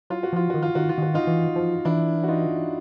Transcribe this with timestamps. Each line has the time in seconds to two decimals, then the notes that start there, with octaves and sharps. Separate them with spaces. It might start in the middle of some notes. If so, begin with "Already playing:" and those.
0.10 F#3 F4
0.23 F#4
0.33 F3 F4
0.50 D#3 F#4
0.63 F4
0.75 D#3 F#4
0.89 F4
0.98 D#3 F#4
1.14 D#4 F4
1.27 E3
1.56 F3
1.85 E3 D4 E4
2.24 F#4
2.28 D#4 F4